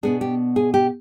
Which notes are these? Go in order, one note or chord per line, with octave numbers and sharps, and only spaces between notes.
B2 B3 D4 G#4
G4
G#4
G4